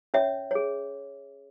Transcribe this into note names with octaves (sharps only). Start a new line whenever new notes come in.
C#4 C#5 E5
G#4 C#5